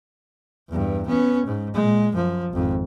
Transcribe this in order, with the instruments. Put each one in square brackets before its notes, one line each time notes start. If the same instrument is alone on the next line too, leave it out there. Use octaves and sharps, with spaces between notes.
[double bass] E2 G2
B3 C#4
G#2
A#2 G#3
F#2 F3
G#1 F2